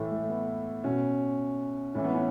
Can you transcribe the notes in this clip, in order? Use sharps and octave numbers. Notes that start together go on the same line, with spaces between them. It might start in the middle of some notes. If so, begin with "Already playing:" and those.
Already playing: A2 E3 A3
A3
B3
B2 C#4
A2 E3 C#4
B3
C#4